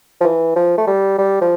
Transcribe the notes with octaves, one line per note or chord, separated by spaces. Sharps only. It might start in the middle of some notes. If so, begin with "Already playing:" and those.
F3
E3
F3
A3
G3
G3
F3